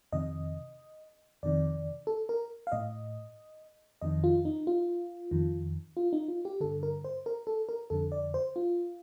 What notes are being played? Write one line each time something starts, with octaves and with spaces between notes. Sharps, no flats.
F2 C3 D#3 D#5
F2 C3 D#3 D5
A4
A#4
F5
A2 D#5
F2 D#3 D#5
F4
D#4
F4
F2 D#3
F4
D#4
F4
G4
G2 D3 A4
A#4
C5
A#4
A4
A#4
F2 D3 A4
D5
C5
F4